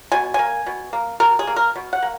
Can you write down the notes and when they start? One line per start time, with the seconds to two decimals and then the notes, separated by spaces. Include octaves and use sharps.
0.12 B2 G#5
0.34 A#3 G#5
0.67 B2
0.93 A#3
1.20 B2 A#4
1.39 G#4
1.47 A#3
1.56 A#4
1.76 B2
1.93 F#5
2.02 A#3